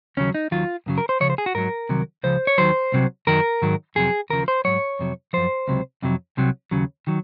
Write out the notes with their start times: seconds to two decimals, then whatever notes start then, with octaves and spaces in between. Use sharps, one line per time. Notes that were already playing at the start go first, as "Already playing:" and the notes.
0.17 D#2 C#3 F#3 C#4
0.35 D#4
0.51 D#2 D#3 F#3 F4
0.86 F#2 C#3 F#3
0.98 A#4
1.09 C5
1.20 C#2 C#3 F3 C#5
1.30 C5
1.38 G#4
1.46 F#4
1.55 G#2 F#3 A#4
1.89 C2 C3 D#3 F#3
2.23 C#2 C#3 F3 C5
2.47 C#5
2.58 D#2 D#3 F#3 C5
2.92 C2 C3 D#3 F#3
3.27 F#2 D#3 F#3 A#4
3.62 G#2 D#3 F#3
3.95 F2 C3 F#3 G#4
4.30 D#2 C#3 F3 A#4
4.48 C5
4.65 G#2 F#3 C#5
4.99 F2 C3 F#3
5.33 F#2 F3 C5
5.68 C#2 C3 F#3
6.02 F2 C3 F#3
6.37 C2 C3 F#3
6.71 D#2 C#3 F#3
7.07 D#3 F#3